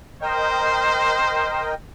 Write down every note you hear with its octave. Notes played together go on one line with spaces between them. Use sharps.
A#4 C5 D#5 G5